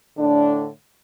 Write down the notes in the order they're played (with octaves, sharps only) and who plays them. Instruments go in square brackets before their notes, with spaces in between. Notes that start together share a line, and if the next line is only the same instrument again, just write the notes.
[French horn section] A2 D3 D4